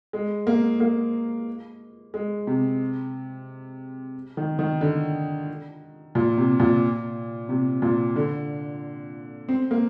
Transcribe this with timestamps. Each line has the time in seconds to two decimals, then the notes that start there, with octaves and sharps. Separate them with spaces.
0.13 G#3
0.47 A#3
0.80 A#3
2.14 G#3
2.47 C3
4.37 D#3
4.59 D#3
4.81 D3
6.15 A#2
6.37 C3
6.60 A#2
7.49 C3
7.82 A#2
8.16 D3
9.49 C4
9.71 A#3